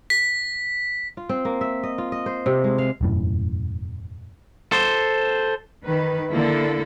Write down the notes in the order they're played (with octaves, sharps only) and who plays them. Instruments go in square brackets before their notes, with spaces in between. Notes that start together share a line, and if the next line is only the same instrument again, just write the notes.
[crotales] B6
[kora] F4
C4
A#3
E5
D#5
F4
D#5
C5
C3
G#3
F5
[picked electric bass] E1 F#2 A2
[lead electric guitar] A4 C5
[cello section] D#3 B4
D3 A#3 E4 A4